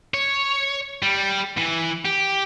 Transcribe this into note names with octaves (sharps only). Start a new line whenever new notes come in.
C#5
G3
E3
G4